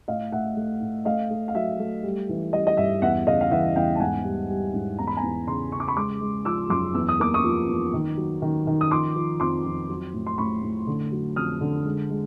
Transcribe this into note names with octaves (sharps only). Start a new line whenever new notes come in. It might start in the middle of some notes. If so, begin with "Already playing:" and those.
A2 D#5 F5
A2 E5 F#5
A3
A2
A3 D#5 F5
A3
F5
F#3 E5
A3
G3
E3
G3 D#5
D#5
G2 E5
E2 E5 F#5
C#3 D#5 F5
F5
E3 E5 F#5
E2 F5 G5
A5
G#2 F#5 G#5
G3
G3
G#2
E2 A#5
B5
G#5 A#5
E2
C#3 A#5 C6
C#3 C#6
D6
B5 C#6
G#3 C6 D6
G#3
F3 D6 E6
F#2 C6 D6
E2 E6
D#6
A#3 D6
C#6 D#6
F3
E2
D#3
F#3
D#3
D#3
D#6
F3 C6 D6
F3
F2 C6 D6
F2
F#3
A2
C6
A2 B5 C#6
A2
D3
F#3
F2 D#6 F6
D3
G#3
G#3